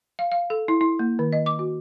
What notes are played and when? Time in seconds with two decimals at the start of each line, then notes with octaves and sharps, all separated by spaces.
0.19 F5
0.32 F5
0.50 A4
0.68 E4
0.81 E4
0.99 A#3
1.19 D#3
1.33 D#5
1.46 D6
1.59 F#4